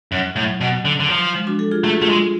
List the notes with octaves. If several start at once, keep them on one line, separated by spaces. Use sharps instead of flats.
F#2
A2 F#3
B2
D3
D3
F3
F3 G#3
D4 F#4
F#4 A4
F4 G#4
A3 G#4
F#4
A3 F4 G#4
G#3